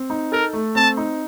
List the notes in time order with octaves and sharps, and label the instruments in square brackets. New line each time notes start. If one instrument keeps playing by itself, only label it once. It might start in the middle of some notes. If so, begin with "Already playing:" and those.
Already playing: [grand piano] C4
D#4
[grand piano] A4 [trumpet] A#4
[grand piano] A3
[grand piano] C4 [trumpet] A5
[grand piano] D#4